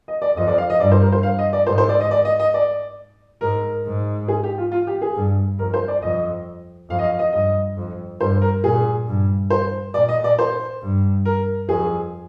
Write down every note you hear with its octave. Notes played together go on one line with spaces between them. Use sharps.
D#5
D5
F2 D#5
D5
F5
D#5
G2 D5
C5
A#4
C5
G2 F5
D#5
D5
G#2 C5
C5
D5
D#5
D5
D#5
D#5
D5
G#2 A#4
G#2
G#4
G4
F4
F4
G4
G#4
G2
F2 A#4
C5
D5
F2 D#5
F2 F5
D#5
F5
D#5
G2 D#5
F2
G2 C5
A#4
A#2 G#4
G2
C5
A#2 D5
D#5
D5
C5
G2
A#4
F2 G#4